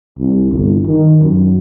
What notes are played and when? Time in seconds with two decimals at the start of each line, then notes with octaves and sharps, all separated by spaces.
0.18 C2
0.51 G1
0.86 D#3
1.21 F#2